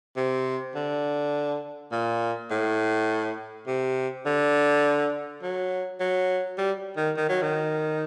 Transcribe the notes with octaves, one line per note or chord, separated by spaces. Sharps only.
C3
D3
A#2
A2
C3
D3
F#3
F#3
G3
D#3
D#3
F#3
D#3